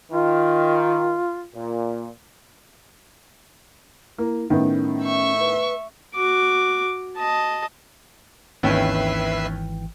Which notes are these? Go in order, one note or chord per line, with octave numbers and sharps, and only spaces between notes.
D#3 F4
A#2
A#3 E4
A2 D#3 B3 C#4
E5 C#6
B4
F#4 D6
D#5 A5
G#1 D#2 E3 C#4 B4 E5 G5 C7